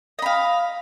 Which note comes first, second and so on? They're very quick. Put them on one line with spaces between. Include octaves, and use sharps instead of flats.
D#5 B5 F5